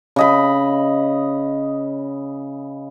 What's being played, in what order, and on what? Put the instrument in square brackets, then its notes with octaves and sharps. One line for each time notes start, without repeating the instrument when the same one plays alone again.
[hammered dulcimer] C#3 D#5 B5